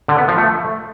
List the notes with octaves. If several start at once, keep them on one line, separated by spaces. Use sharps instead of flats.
D3
B3
F3
A3